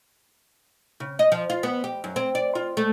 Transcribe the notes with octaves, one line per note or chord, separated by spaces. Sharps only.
C#3
D#5
F3
F4
B3
G4
F#2
C4
D5
F4
A3